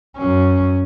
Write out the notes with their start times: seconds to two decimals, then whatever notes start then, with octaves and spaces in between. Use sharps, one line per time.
0.18 F#2 C#4